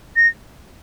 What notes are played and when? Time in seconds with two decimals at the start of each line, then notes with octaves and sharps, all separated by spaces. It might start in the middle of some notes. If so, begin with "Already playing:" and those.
0.16 A#6